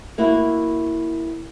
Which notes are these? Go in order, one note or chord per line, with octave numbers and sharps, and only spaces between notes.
A#3 E4 F#4